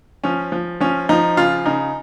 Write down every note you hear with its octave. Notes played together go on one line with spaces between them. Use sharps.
F3 C#4
F3
F3 C#4
F3 D#4
C#3 F4
C#3 D#4